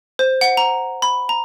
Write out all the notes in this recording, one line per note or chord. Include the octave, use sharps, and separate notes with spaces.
C5
F#5
A#5
B5
A#5